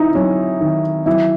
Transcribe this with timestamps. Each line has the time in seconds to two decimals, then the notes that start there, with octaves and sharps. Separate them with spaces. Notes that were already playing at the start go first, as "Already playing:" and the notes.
Already playing: C4 D#4 E4
0.15 F#3 C#4
0.61 D#3
1.06 F#3 E4